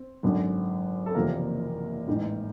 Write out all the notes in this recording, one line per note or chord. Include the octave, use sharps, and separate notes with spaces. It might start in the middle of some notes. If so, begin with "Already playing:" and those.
Already playing: C4
G#1 F#2 D3
A4
F#1 E2 C3 F3 A#3 A#4
A1 G#2 E3